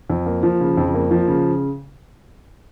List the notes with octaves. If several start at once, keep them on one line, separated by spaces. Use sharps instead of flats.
F2
A#3
F3
C#3
F2
A#3
F3
C#3